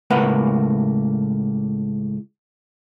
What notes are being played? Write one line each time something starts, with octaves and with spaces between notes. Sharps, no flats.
C#2 A2 A#3 B4 F#5